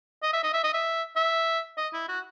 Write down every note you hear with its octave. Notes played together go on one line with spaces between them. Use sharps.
D#5
E5
D#5
E5
D#5
E5
E5
D#5
E4
F#4